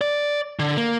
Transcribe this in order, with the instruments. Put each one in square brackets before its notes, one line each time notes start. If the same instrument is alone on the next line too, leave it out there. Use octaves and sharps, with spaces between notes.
[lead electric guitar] D5
D3
A#3